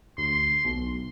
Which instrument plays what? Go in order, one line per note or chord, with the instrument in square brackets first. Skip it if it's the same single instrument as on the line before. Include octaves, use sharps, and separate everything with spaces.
[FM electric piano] D2 [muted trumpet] C6
[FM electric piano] B1